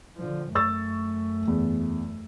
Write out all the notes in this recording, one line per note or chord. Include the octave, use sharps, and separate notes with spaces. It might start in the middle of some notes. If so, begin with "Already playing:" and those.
D3 F3
F#2 A3 C#6 E6 A6
E2